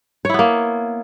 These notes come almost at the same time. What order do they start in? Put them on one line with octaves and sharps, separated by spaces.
C#5 E4 B3 A#3